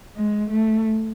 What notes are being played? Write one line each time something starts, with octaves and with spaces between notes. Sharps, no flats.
G#3
A3